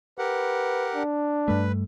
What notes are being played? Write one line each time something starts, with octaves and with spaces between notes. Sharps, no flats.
G4 A#4 B4 F#5
D4
G2 G3 A3 B4